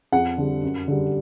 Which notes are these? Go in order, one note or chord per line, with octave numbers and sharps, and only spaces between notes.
F2 F#5
D3 G3
F#2
D3 G3